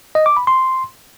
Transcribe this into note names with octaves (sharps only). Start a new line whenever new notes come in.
D#5
D6
B5
C6